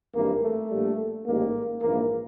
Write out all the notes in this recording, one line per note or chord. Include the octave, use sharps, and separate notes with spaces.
G#1 G2 E3 A#3
A3
A#1 A#2 G3
A1 G#2 D#3 G3 A#3
A#1 G#2 E3 A#3